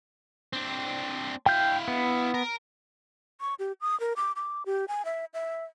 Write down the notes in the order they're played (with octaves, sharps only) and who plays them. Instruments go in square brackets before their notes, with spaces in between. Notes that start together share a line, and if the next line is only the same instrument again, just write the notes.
[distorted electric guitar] C4 D4
[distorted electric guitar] E4 F5 [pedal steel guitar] G5 G6
[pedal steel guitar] B3
[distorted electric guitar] A#4
[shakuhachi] C#6
G4
D#6
A#4
D6
D6
G4
G#5
E5
E5